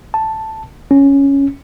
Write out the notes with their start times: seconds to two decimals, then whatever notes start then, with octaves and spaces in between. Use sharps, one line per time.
0.14 A5
0.91 C#4